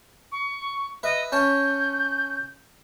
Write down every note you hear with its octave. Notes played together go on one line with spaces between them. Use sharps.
C#6
B4 D#5 E5
C#4 C#5 A5 G6